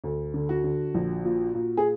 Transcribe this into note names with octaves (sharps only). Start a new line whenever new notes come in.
D2
D3
F#4
D3
A#1
A#2
A#2
G#4